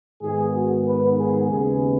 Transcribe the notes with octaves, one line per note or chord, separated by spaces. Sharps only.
G#2 D#3 B3 G#4
F#4
B4
G#4
D#2 C#3 G#3 B3 G#4